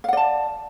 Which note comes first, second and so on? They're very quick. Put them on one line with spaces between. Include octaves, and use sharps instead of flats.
F5 F#5 D5 A5